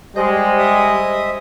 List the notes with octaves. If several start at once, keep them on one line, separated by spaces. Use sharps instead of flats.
G3 G#3 G4 C5 D#5
D#5 E5 D#6